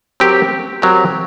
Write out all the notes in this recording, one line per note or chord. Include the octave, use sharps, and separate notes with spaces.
F#3 C4 G4 A#4
F#3 C4 G4 A#4